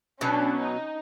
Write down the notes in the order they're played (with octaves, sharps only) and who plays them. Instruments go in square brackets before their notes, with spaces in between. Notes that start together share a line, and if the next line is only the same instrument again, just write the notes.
[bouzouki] B2 F#3 [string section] C#4 D4
[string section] D#4